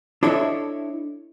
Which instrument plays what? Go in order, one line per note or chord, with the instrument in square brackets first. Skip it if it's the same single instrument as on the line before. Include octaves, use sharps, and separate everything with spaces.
[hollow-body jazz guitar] D4 E4 A4 C#5 D#5 E5